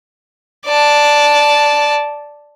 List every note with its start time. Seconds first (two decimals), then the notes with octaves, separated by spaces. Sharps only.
0.66 D5 A5